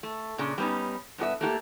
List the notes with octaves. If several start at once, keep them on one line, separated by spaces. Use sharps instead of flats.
A3
A#2 C#3 D4
G3 A3 B3 C#4 D#4
G2 B3 G4 E5
A3 A#3 F#4 G4